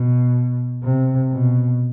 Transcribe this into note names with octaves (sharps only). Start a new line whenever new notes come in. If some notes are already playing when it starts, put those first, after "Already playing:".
Already playing: B2
C3
B2